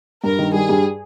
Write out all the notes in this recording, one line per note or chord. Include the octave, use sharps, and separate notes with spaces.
G2 A#4
D#3
G3 G#4
G2